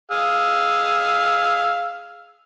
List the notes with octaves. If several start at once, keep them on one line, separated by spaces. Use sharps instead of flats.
G#4 F5 E6